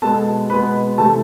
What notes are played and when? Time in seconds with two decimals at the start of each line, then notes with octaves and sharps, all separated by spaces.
0.02 B2 G#3 B3 A4 A5
0.50 B2 G#3 B3 B4 B5
0.98 C3 E3 A3 A4 A5